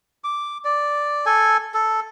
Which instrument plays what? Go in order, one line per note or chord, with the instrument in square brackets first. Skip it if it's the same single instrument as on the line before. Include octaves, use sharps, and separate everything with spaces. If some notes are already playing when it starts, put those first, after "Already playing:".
[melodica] D6
D5
A4 G#5
A4